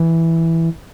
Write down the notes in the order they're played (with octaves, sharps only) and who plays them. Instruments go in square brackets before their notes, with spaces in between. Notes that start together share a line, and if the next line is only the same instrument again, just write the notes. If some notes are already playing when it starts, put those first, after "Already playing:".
Already playing: [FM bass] E3